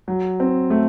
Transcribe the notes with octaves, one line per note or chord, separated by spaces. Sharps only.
F#3
C4
A3